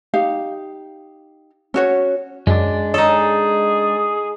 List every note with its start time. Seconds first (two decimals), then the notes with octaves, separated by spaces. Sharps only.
0.14 D#4 G4 F5
1.74 C#4 F#4 C#5
2.47 F#2 G#3 D4
2.94 D#4 G#4 A4 C#5